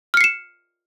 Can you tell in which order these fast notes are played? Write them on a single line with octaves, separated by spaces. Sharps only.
F6 C#7 C7 E7